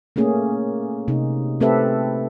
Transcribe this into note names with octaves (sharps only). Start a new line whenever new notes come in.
A3 A#3 C#4 G#4
C3 D#4
A3 C4 G4 A4 B4 E5